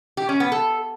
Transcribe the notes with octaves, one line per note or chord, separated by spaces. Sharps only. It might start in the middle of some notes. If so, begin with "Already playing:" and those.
G4
C#4
B3
A4